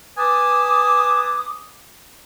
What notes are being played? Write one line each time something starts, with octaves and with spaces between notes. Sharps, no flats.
B4 G#5 A5 D6 D#6